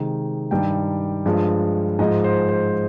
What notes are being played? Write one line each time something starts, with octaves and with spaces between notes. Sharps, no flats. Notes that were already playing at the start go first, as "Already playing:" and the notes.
Already playing: C3 D#3 G#3
G2 D#3 G3 G5
G2 F3 G#3
G#2 F3 G#3 D#5
C5
C5